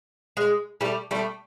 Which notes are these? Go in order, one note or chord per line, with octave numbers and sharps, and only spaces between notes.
G#3
G3 A3
G3 A3